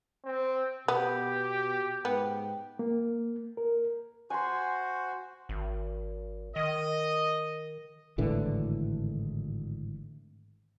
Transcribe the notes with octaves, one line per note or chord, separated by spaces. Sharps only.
C4
B2 B3 G4
G#2 B3 G5
A#3
A#4
F#4 C5 F#5 G#5 C6
G#1
D#3 D#5
G#1 A2 D3 E3